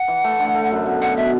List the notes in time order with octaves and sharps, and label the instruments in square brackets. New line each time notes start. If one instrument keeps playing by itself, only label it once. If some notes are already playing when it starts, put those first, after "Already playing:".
Already playing: [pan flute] F#5
[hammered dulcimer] E3
A3
D3
A3
F#2
B2
[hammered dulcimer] B2 [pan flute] F#5
[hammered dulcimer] B2 [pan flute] E5